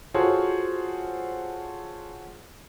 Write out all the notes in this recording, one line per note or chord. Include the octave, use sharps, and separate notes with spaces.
F4 F#4 G#4 A4 C5 C#5